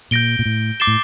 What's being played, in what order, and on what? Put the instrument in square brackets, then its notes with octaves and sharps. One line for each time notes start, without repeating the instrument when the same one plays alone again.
[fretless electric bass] A#2 [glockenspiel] G6 A#6 D7 G7
[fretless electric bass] A#2
A2
[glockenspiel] D6 A6 C7 E7 G7
[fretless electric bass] A2